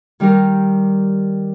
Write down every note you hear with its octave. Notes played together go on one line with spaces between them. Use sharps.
D#3 G3 D#4 G4 A#4